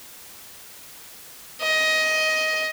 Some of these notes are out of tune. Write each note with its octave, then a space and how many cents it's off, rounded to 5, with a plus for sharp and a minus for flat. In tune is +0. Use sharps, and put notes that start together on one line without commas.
D#5 +15